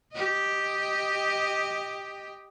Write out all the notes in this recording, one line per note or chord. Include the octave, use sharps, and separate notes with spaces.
G4 D#5